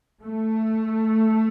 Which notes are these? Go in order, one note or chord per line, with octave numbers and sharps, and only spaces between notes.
A3